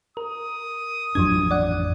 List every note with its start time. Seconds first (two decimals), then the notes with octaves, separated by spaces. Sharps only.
0.17 A#4 D#6
1.15 A1 F2 F3 F#3 D4 G#6
1.51 D5 F#5